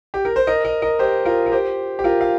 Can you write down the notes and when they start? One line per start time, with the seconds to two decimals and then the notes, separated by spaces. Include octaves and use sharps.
0.14 G4
0.25 A#4
0.36 C5
0.47 A#4 D#5
0.64 A#4 D#5
0.82 A#4 D#5
0.99 G4 C5
1.25 F4 A#4
1.46 A#4
1.52 G4 C5
1.99 G4
2.04 F4 A#4
2.21 F5